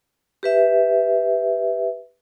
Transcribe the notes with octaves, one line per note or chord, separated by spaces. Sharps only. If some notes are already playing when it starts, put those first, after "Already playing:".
G4 B4 E5